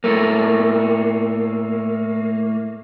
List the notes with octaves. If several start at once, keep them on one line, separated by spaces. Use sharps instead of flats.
A2 A3 A#3